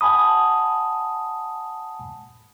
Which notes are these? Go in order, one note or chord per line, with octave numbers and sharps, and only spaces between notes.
F#5 G#5 A5 B5 D#6